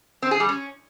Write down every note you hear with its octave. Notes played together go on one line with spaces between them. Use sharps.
C4
G#4
G3
C#4